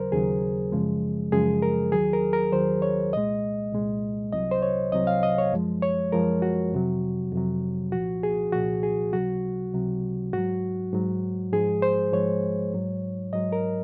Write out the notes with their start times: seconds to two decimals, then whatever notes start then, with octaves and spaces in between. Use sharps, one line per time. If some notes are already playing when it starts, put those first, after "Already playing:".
Already playing: D#2 C#3 F#3 A#4 C5
0.12 D#2 C#3 F#3 G#4
0.72 F#2 C#3 F3 G#3
1.32 F#2 C#3 F3 G#3 G#4
1.62 A#4
1.92 D#2 D#3 F#3 G#4
2.13 A#4
2.33 A#4
2.52 D#2 D#3 F#3 C5
2.82 C#5
3.12 C2 A#2 G#3 D#5
3.72 C2 A#2 G#3
4.32 C2 C3 F#3 D#5
4.51 C5
4.62 C#5
4.92 C2 C3 F#3 D#5
5.07 F5
5.23 D#5
5.38 C#5
5.52 F#2 F3 G#3
5.82 C#5
6.12 F#2 F3 G#3 A#4
6.42 F#4
6.72 F2 C3 F#3
7.32 F2 C3 F#3
7.92 C2 A#2 F3 F#4
8.23 G#4
8.52 C2 A#2 F3 F#4
8.83 G#4
9.13 C#2 C3 F#3 F#4
9.73 C#2 C3 F#3
10.33 G#2 F#3 F#4
10.92 G#2 F#3
11.53 G#2 F3 G#3 G#4
11.82 C5
12.12 G#2 F3 G#3 C#5
12.73 G#2 F#3
13.33 G#2 F#3 D#5
13.52 A#4